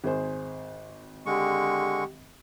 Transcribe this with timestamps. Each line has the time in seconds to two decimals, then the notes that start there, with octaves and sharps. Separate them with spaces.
0.04 G#1 G#4 C5
1.26 D3 G#3 G4 C#6